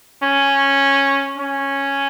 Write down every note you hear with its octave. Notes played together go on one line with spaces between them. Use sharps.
C#4
C#4